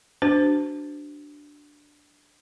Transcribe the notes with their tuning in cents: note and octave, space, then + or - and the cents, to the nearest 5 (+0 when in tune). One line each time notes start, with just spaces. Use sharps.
D4 +0 F#4 +15 C5 -30